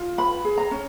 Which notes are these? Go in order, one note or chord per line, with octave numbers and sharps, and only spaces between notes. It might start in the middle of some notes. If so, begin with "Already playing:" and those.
Already playing: F4
B4 B5
G#4
A#5
C#4